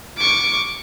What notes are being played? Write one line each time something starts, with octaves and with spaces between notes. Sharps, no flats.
C#6 D6